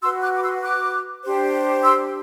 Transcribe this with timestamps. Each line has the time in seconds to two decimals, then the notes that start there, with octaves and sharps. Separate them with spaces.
0.02 F#4 B4 C6 E6
0.22 D6 F#6
0.35 D6
0.43 C6 E6
0.63 D6 F#6
1.23 D4 G4 C5
1.83 C6 E6